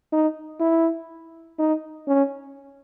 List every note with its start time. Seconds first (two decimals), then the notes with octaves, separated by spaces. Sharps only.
0.12 D#4
0.60 E4
1.59 D#4
2.08 C#4